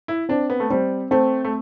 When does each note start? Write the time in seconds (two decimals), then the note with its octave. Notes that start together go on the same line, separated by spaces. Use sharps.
0.08 E4
0.29 C4 D4
0.50 B3
0.60 A3
0.70 G3 C4
1.11 A3 C4
1.44 A3